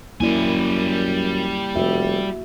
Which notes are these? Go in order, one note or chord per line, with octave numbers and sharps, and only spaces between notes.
F#2 G3 A#3 E4 D5 G#5
F1 F#4 E5